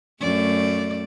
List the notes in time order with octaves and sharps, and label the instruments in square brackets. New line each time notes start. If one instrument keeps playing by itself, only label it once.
[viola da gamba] F#2 A3 D5